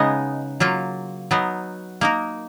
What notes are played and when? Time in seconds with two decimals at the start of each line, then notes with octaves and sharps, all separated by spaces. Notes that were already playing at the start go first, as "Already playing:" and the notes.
Already playing: C#3 G#3 B3 D#4
0.60 F#3 A#3 F4
1.31 F#3 B3 D#4
2.01 A#3 D#4 A#4